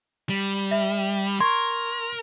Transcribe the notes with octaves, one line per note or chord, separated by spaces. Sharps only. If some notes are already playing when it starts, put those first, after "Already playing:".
G3
E5
A#4 C6 C#6 G#6